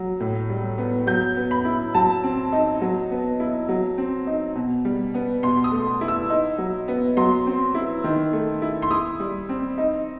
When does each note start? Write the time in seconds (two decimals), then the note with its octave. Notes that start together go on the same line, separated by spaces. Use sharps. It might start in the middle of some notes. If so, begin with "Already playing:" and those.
Already playing: F#3
0.20 A2
0.49 G3
0.78 B3
1.07 F#3 G6
1.36 B3
1.51 B5
1.65 E4
1.95 F#3 A5
2.23 C4
2.52 D#4
2.82 F#3
3.11 B3
3.40 E4
3.69 F#3
3.98 C4
4.27 D#4
4.55 B2
4.85 G3
5.14 B3
5.43 B2 C6
5.64 D#6
5.72 A3
6.01 E4
6.08 E6
6.30 D#4
6.58 F#3
6.88 B3
7.17 F#3 C6
7.47 C4
7.75 E4
8.04 D#3
8.33 A3
8.62 E4
8.82 C6
8.90 E4 D#6
9.20 G3
9.49 C4
9.78 D#4